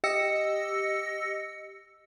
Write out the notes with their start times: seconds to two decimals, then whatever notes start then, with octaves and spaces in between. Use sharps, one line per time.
0.04 G4 D#5 E6 A#6 C#7